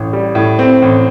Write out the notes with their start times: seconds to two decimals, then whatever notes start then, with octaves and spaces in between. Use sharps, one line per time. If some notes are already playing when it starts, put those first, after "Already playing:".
Already playing: A1
0.13 G3
0.35 A2
0.59 C4
0.82 A1